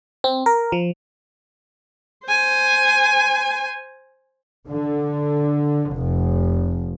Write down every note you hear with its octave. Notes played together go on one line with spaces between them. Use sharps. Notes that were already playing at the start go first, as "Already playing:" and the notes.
C4
A#4
F3
C5 G#5
D3
F1